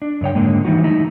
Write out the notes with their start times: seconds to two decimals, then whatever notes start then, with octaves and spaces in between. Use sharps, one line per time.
0.02 D4
0.21 F#2 C#3 C#5 G5
0.35 G#2 D3 D#3 G#3 A#3
0.65 D#3 E3 G3 D#4 F#4
0.84 A3 D#4 E4